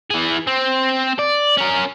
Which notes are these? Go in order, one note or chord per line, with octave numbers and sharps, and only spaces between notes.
E3 G#4
C4
D5
C#4 A#4